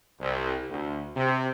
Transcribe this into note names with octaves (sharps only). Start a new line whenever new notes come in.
C2
D2
C3